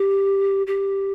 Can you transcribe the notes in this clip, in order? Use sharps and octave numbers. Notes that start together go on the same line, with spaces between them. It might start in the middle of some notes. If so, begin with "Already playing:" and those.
Already playing: G4
G4